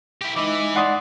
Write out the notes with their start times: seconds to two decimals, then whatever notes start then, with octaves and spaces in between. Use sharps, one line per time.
0.21 E4 G4
0.36 E3 G#3 D#4 E4 D#5 D6
0.76 D5 F#5 C6 D#6